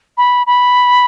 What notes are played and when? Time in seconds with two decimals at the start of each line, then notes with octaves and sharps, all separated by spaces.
0.17 B5
0.47 B5